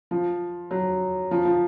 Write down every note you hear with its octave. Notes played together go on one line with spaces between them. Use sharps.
F3
F#3
F3
F3